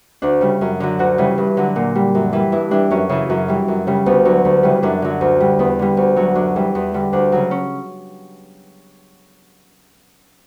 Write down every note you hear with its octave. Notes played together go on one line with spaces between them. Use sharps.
D2 D4
C#3 G3
F#2
D3 F#3
D2 F#4
C#3 E3 G3
G2
D3 F#3
A#2
G3
F#2
E3 G3
G2 E4
E3 G3 D4
F#2 C#4
C#3 E3
F#2
E3 G3
F#2
C#3 G3
D2 B3
D3 F#3
D2
C#3 E3 G3
F#2 D4
D3 F#3
D2
D3 G3
E2 B3
D3 G3
D2
D3 F#3
F#2 D4
E3 G3
E2
D3 G3
D2 D4
C#3 F#3
C#4